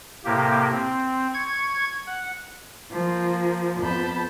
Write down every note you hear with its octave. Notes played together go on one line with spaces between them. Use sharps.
A2 C3 A#3 G4
C4
C#6 G#6
F#5
F3 A#3
F2 B3 A5 B5 G6